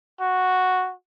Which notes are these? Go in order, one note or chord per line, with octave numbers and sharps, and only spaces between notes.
F#4